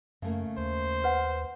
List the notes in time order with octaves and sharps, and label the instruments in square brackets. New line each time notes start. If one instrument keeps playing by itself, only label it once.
[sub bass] F#2 [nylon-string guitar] C#3 A3 A#3
[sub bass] D#2 [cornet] C5
[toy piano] B4 F#5